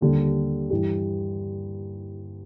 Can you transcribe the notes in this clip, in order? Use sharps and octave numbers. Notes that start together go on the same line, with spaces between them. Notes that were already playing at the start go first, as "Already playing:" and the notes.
D#2 D3 G3
G2 E3 G3